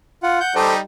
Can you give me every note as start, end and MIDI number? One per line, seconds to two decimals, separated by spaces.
0.23 0.40 65
0.23 0.40 78
0.40 0.54 78
0.40 0.54 91
0.55 0.79 55
0.55 0.79 63
0.55 0.79 67
0.55 0.73 69
0.55 0.73 72